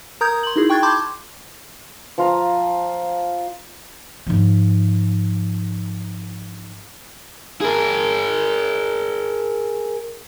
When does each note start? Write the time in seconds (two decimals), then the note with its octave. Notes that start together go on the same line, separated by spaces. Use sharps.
0.21 A#4 A#5 D#6 G6 G#6
0.43 C6 F#7
0.56 D#4 E4 F#4 G#4
0.70 G5 C#6 F#6 G#6 A6
0.83 A5 B5 C6 D6 G6 G#6
2.18 F3 F4 A#5 D#6
4.27 G#2 F3
7.61 G#4 A#4